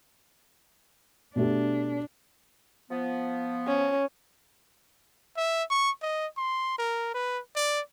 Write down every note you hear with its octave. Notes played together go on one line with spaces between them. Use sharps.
B2 A3 D4 G4
F3 B3
C#4
E5
C#6
D#5
C6
A#4
B4
D5